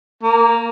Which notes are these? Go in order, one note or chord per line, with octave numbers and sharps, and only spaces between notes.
A#3